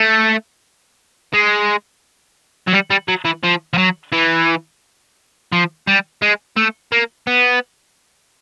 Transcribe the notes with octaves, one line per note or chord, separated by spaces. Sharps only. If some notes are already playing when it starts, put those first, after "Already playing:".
Already playing: A3
G#3
F#3
G3
G3
F#3
E3
F3
F3
F#3
E3
F3
G3
G#3
A3
A#3
B3